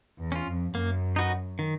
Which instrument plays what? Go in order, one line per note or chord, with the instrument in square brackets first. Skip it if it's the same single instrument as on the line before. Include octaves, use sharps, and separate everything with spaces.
[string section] E2
[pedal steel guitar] C#4 F4
[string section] F2
[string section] F#2 [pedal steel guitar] A#3
[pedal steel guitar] D#4 F#4 B4 D#5
D#3